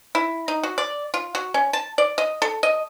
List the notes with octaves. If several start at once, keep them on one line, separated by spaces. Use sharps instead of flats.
E4
D#4
F#4
D5
F4
F#4
C#4
A5
D5
D#5
A4
D#5